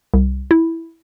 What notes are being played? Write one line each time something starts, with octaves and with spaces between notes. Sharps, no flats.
C2
E4